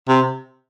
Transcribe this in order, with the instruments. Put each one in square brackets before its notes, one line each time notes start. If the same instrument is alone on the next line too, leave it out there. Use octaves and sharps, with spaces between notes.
[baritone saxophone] C3